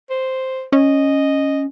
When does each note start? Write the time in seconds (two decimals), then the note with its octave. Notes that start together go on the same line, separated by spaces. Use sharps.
0.10 C5
0.72 C#4 D#5